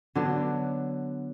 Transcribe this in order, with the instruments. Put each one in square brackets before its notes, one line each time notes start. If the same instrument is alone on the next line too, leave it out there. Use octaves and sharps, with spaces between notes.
[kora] D3 F#3 B3 D4